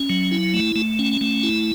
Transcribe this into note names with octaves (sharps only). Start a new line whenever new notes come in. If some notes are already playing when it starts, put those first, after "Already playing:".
Already playing: C#4
F#3
E4
A3
A3
C#4
A3
E4